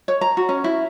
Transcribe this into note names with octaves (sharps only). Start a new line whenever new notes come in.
C#5
A#5
F#4
C#4
E4